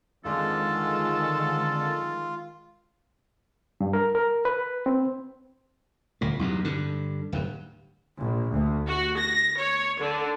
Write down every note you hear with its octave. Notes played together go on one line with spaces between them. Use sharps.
F2 D3 D#3 F3 G#3 F4 A4
G2
A#4
A#4
B4
C4
D#1 D2 A#2
B1 E2 G2
G2 D3
D1 G2
A#1
D2
F#4
A#6
C#5
D3